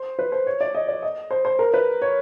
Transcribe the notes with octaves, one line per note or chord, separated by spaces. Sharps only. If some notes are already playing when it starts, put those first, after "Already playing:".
Already playing: C5
B4
C5
C#5
D5
D#5
D5
D#5
C5
C5
A#4
B4
C#5